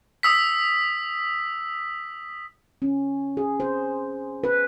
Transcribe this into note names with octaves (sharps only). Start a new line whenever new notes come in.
D#6 E6 B6
C#4
G#4
C5
B4